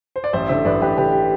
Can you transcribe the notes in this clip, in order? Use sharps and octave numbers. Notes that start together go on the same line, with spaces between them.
C5
D5
A1 C5 E5
D3 C5 E5
A1 B4 D5
A1 G4 B4
D3 G4 B4